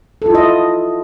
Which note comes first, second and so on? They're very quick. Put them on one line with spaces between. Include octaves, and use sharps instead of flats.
A4 F4 E4 D#5